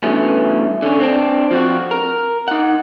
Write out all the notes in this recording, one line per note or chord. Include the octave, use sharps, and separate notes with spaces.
G2 B2 E3 A3 C#4
D3 C#4
C4 D4
F3 C4 F#4
A#4
D#4 F#5